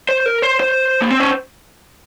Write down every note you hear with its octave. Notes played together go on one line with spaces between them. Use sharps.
C5
A#4
C5
C5
A#3
C4
C#4